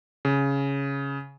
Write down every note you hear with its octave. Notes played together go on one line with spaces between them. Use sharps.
C#3